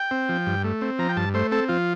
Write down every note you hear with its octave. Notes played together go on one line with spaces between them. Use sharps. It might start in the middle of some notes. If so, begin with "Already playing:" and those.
Already playing: G5
C4
F3
G2
A3
C4
F3 A#5
G5
G2 A5
A3 C5
C4 A4
F3 F4